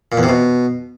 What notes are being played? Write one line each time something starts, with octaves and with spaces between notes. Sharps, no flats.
A#2
E2
C3
B2